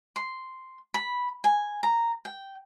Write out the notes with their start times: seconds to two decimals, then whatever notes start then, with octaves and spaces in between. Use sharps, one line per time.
0.16 C6
0.94 B5
1.44 G#5
1.83 A#5
2.25 G5